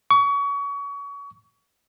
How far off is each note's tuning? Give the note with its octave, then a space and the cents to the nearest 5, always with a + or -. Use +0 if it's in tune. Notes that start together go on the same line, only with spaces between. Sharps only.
C#6 +30